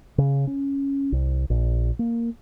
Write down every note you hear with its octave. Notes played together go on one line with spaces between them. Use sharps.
C#3
C#4
C2
A#1
A#3